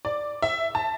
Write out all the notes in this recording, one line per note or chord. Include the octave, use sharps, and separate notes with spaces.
D5
E5
A5